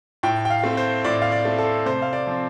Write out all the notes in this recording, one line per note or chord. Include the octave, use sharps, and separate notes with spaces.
A2 G5
G5
F5
A3 C4
C5
A2 D5
F5
D5
A3 C4
A4
C3 C5
F5
D5
F3 C4